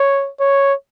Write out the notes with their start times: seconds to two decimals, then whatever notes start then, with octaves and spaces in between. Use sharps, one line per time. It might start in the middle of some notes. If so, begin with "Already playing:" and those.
Already playing: C#5
0.40 C#5